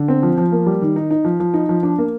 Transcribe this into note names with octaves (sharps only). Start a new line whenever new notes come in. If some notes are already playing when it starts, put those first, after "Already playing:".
Already playing: D3
C4
F3
F3
A#3
G3
D#3
D#4
D#4
F3
F3
D#4
F3
D4
A#3